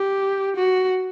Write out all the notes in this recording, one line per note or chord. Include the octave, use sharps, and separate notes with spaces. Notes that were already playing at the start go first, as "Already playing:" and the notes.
Already playing: G4
F#4